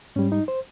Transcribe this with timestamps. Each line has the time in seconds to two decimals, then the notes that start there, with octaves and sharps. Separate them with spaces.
0.16 G#2 G3 C#4
0.32 D#4
0.48 C5